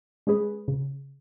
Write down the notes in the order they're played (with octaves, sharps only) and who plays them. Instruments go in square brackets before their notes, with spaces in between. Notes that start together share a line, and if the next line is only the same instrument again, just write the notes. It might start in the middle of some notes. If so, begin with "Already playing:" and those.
[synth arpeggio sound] G#3 C#4 G#4 B4
C#3